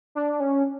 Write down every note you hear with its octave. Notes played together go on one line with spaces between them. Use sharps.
D4
C#4